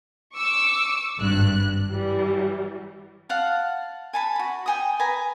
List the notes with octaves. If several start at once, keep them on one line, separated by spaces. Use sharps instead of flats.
C#6 D6 E6 C#7
G#1 G2 F#6
E3 G3
F5 F#5 A5
G#5 A5 B5
F#4 B5
G5 G#5 D#6
B4 G#5 A#5